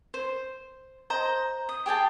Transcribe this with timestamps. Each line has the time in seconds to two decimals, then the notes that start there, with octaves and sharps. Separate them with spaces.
0.14 C5
1.10 C5 D#5 A#5
1.69 D#6
1.86 G4 G#4 G5 A5